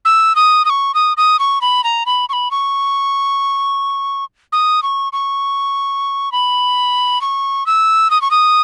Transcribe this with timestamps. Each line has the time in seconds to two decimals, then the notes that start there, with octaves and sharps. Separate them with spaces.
0.05 E6
0.36 D#6
0.65 D#6
0.70 C#6
0.94 D#6
1.17 D#6
1.39 C#6
1.61 B5
1.84 A#5
2.06 B5
2.29 C#6
2.33 B5
2.51 C#6
4.52 D#6
4.83 C#6
5.13 C#6
6.32 B5
7.21 C#6
7.66 E6
8.11 D#6
8.22 C#6
8.31 D#6